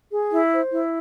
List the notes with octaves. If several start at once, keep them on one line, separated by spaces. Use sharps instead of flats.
G#4
E4
C5
E4